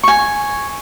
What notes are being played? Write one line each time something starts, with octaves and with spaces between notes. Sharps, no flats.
G#5 C#6